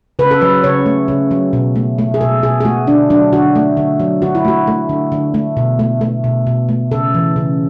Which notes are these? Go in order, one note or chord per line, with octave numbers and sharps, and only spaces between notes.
C#3 B4
A4
F#3 B4
C#3 C#5
A3
C#3
F#3
B2
A3
A3
G#4
B2 A4
B2 G#4
G#4
A3 F#4
D3 D4
F#3 D4
D3 F#4
A3
D3
F#3
D3 F#4
E4
A3 F#4
A3
D3
D3
A3
B2
A3
A3
B2
B2
A3
C#3 A4
E3
C#3